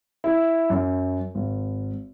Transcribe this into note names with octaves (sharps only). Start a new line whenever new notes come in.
E4
F#2
G#1